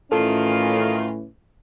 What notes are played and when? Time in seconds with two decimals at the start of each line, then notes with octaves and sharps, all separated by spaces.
0.12 A2 D#3 E3 C#4 F4 A4